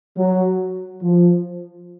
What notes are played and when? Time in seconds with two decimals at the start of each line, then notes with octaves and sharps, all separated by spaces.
0.16 F#3
1.02 F3